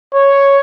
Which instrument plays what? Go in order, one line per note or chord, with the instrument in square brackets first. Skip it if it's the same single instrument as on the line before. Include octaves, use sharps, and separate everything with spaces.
[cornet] C#5